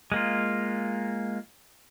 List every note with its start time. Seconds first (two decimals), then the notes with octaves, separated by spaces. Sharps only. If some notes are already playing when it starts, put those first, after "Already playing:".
0.12 G#3 A#3 F4